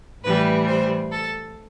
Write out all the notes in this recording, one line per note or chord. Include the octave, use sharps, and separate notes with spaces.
A2 E3 G3 B4
C5
A4